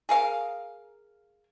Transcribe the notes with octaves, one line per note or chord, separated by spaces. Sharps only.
G#4 A#4 F5